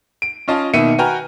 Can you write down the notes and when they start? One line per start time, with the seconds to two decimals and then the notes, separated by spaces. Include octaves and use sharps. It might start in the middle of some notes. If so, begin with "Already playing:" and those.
0.22 D7
0.48 C#4 F4 D#5 A5
0.73 B2 D#3 A#3 E5 C#7 D#7
0.98 F#4 B4 G5 G#5 A#5 F6